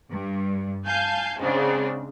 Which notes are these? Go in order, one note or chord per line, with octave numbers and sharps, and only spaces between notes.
G2
F5 G#5 A5 G6
G#2 C#3 C4 D4